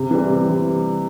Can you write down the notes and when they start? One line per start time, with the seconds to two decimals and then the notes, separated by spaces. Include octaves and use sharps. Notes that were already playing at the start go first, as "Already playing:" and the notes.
Already playing: C3
0.11 E3 G3
0.30 C3
0.47 E3 G3